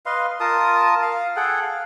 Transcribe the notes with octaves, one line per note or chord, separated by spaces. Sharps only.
B4 D#5 F5 C6
F4 A#4 A5 D#6
F5
G#4 A4 F#5 G5
F5